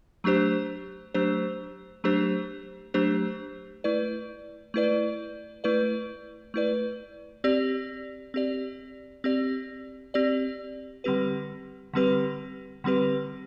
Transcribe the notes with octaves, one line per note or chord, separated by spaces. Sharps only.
F#3 A3 D4 G4 C5
F#3 A3 D4 G4 C5
F#3 A3 D4 G4 C5
F#3 A3 D4 G4 C5
A3 E4 B4 D5
A3 E4 B4 D5
A3 E4 B4 D5
A3 E4 B4 D5
C4 G4 D5
C4 G4 D5
C4 G4 D5
C4 G4 D5
D3 G3 C4 G4 B4
D3 G3 C4 G4 B4
D3 G3 C4 G4 B4